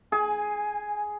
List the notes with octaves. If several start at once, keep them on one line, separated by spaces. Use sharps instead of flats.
G#4 G#5